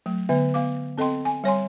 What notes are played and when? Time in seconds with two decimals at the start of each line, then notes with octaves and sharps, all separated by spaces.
0.06 F#3 A3
0.29 D3 B3 E5
0.54 B3 F5 D6
0.98 C4 A4 D#5 G5 C6
1.25 G#5
1.44 G3 C#5 G#5 C6